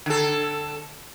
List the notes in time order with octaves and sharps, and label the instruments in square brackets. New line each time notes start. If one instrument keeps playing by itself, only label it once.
[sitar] D3 A4